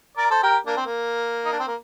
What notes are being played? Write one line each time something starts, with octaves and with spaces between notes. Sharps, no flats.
A#4 D5
A4 C5
G4 A#4
A#3 D4
C4
A#3
D#4
D4
C4
A#3